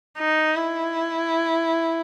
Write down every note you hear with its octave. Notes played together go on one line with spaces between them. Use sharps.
D#4
E4